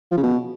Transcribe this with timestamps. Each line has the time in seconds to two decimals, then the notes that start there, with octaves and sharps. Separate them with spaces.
0.11 F3
0.17 C#3
0.23 B2